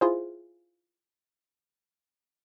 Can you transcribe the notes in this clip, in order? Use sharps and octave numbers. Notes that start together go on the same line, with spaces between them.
E4 F4 G#4 C5